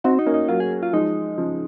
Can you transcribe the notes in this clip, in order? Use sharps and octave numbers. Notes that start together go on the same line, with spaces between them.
C4 D#4 F#4
D#4
A#3 C#4
D#4
F#3 A#3 F4
G#4
F4
F3 G#3 D#4
C#3 F3